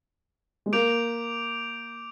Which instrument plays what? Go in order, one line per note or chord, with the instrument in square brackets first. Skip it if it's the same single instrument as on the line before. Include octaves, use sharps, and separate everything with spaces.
[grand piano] G#3
[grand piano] A#3 [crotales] D6 G6 D7 F7